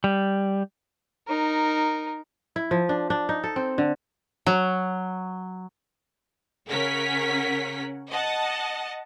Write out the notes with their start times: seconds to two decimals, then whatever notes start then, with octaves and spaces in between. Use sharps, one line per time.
0.04 G3
1.28 D#4 A#4
2.56 E4
2.71 F3
2.89 D4
3.10 D4
3.29 D#4
3.44 A4
3.56 C4
3.78 D3
4.46 F#3
6.69 C#3 C#4 A#4 F#5 B6
8.10 D#5 F#5 A5